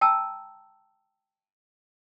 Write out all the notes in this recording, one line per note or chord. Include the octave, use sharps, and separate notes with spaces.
G5 A5 A#5 E6